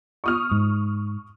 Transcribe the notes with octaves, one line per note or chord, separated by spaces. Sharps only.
C#6 D#6 F6
G#2